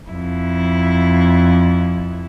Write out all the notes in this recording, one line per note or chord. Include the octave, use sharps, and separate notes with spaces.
F2 E4